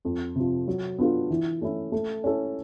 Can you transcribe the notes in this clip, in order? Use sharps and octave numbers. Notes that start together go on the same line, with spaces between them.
F2
C3 F3
F#3
B3 D4 F4 A4
E3
A3 C#4 E4
A3
C#4 E4 A4